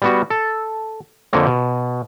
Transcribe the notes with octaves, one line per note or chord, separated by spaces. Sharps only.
G3 B3 F#4
A4
F2 D3 A#3 C4 C#5
B2